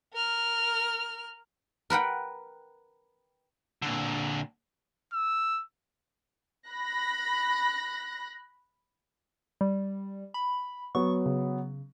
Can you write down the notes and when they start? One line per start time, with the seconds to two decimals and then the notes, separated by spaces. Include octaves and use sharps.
0.13 A#4 F6
1.90 A#4 B4 F#5 G5
3.82 A#2 D3
5.13 E6
6.67 B5 F#6 A#6
9.61 G3
10.34 B5
10.95 F#3 B3 C#6
11.26 C#3